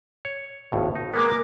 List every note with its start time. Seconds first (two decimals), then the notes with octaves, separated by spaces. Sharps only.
0.25 C#5
0.72 G#1 D#2 A2
0.95 D#4
1.14 G#3 A#3 B3 A#4 D6